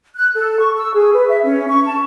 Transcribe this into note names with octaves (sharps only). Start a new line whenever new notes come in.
F#6
A4
C#6
E6
G#4
B4
E5
C#4
C#6
A5